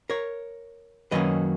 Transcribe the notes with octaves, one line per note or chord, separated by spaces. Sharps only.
A#4 C#5
F#2 D#3 F#3 A#3 C#4 B4 D#5